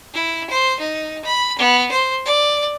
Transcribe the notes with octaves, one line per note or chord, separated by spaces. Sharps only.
E4
C5
D#4
B5
B3
C5
D5